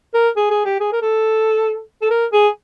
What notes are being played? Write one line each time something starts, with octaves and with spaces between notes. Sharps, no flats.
A#4
G#4
G#4
G4
G#4
A#4
A4
A4
A#4
G#4